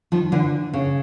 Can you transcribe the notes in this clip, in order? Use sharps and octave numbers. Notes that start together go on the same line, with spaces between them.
D#3 F3
D3 E3
C#3